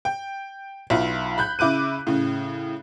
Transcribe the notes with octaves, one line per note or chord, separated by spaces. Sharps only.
G5
B1 E4 F4
B5 F#6 G6
C#3 E4 D6 F#6 D#7
A2 C#3